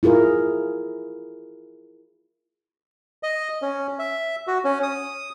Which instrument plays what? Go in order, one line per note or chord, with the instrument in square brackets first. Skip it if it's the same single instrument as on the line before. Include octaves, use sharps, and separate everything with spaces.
[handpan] E4 F4 G#4 A#4
[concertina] D#5
C#4
E5
F#4
C#4
D#6